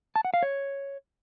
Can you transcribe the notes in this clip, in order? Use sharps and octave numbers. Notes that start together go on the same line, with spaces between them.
A5
F#5
F5
C#5